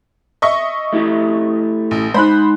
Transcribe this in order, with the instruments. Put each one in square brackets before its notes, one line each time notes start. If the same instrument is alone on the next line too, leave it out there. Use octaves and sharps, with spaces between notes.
[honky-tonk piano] D#5 E5 C#6
[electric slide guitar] A3 E4 G4
[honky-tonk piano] A1
[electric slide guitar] G#3 D#4 [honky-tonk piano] C5 B5 F#6